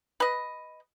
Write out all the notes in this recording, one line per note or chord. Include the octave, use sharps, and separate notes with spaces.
B4 D#5